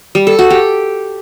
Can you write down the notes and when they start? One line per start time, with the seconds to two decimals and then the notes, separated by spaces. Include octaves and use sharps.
0.15 G3
0.27 A4
0.39 F#4
0.50 G4